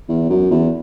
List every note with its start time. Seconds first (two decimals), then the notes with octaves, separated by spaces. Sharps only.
0.09 E2
0.30 F#2
0.51 E2